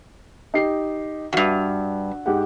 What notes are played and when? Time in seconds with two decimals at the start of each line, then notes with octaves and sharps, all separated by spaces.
0.54 D#4 G4 C7
1.33 E2 G2 F#4 E5
2.26 G#2 G4 F#5